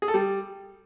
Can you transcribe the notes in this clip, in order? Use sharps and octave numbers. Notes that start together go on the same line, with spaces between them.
G#4
A4
G3